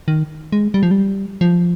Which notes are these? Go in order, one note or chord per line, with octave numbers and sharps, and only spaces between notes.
D#3
G#3
G3
F3
G3
F3